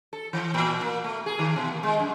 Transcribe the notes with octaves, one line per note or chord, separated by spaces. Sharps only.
A4
E3
A#2
A#3
A3
G#4
D#3
B2
A#3
G#3
F#2